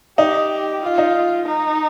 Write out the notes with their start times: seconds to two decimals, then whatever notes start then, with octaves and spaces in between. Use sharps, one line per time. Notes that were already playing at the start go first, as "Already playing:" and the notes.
0.18 D#4 G4
0.82 F4
0.98 D#4
1.45 D#4